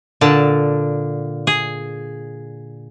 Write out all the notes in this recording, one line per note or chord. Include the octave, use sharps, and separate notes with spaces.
A#2 D3 A5
G#4